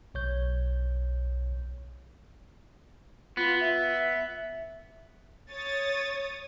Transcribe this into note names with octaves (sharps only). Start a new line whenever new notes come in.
B1 C#5 G6
B3 F4
E5
C#5 D#6 A6